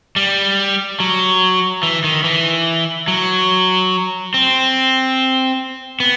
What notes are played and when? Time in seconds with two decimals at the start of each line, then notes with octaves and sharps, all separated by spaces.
0.16 G3
1.00 F#3
1.83 E3
2.04 D#3
2.24 E3
3.08 F#3
4.34 C4
6.00 B3